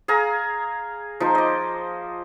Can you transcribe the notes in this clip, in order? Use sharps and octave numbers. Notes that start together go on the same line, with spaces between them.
G#4 F5 G#5 A#5
F3 D#4 C5
D#5 D6